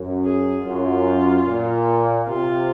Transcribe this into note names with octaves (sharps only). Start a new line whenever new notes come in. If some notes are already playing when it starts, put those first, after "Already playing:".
Already playing: F#2
G#4
F#2 F4
A#2
C3 F4